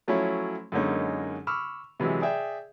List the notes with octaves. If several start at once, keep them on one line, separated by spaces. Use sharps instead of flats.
F3 F#3 A3 C#4 E4
F#2 D3 G#3 A#3 C#4 D#4
B5 C#6 D6 E6 F6
C3 E3 F#3 G#3
G#4 D5 E5 G5